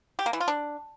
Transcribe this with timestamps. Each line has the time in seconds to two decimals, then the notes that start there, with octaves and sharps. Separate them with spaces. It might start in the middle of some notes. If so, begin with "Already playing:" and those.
0.19 G4
0.26 A#3
0.33 E3
0.40 F4
0.48 D4